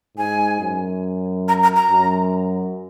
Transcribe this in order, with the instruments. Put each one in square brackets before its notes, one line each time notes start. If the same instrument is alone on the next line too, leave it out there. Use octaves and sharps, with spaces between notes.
[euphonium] G#2 [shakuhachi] G#5
[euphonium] F#2
[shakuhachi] A#5
A#5
A#5
[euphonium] F#2